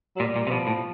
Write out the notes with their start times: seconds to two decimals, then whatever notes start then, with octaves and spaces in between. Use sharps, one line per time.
0.16 F#3
0.20 A#2 G3
0.36 A#2
0.47 C3
0.51 B2 F3
0.67 A2